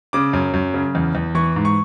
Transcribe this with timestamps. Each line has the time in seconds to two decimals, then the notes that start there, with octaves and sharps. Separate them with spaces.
0.13 C#3 D6
0.33 F#2
0.54 F#2
0.74 C#3
0.95 E2
1.15 E2
1.35 E3 C#6
1.56 G#2
1.65 C#6